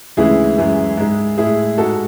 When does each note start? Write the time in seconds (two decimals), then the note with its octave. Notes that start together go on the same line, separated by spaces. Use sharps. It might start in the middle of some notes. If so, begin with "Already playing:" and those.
0.17 D2 C#3 E3 G#3 E4 G#4
0.58 F#2 E3 G#3
0.97 G#2 G#3
1.37 A2 G#3 E4 G#4
1.78 G#2 G#3 F#4 A4